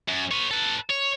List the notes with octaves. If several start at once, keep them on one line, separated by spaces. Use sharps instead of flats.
F#2
B4 C#5
A4 B4
C#5